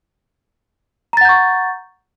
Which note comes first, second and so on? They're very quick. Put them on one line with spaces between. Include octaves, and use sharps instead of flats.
A#5 A6 F#5 G6 C#6